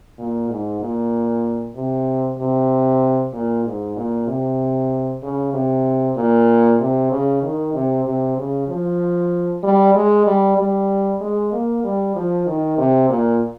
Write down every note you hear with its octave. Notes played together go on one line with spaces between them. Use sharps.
A#2
G#2
A#2
C3
C3
A#2
G#2
A#2
C3
C#3
C3
A#2
C3
C#3
D#3
C3
C3
C#3
F3
G3
G#3
G3
G3
G#3
A#3
G3
F3
D#3
C3
A#2